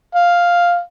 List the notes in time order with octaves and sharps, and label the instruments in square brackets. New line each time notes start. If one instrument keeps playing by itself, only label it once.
[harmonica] F5